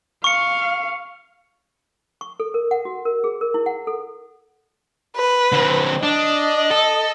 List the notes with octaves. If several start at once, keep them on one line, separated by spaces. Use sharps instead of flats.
F5 C#6 C#7
C#6
A4
A#4
F#5
F#4
A#4
G#4
A#4
E4
F#5
A4
B4
D3 C4
D4 D#5
A4